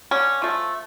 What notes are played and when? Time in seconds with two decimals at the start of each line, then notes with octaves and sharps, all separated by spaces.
0.11 D3 C#4
0.42 F3 A3